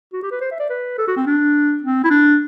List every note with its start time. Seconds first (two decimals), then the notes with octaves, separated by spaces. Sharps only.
0.13 F#4
0.23 G4
0.31 B4
0.41 C5
0.51 E5
0.60 D5
0.70 B4
0.98 A4
1.07 F#4
1.17 C4
1.26 D4
1.83 C4
2.04 E4
2.11 D4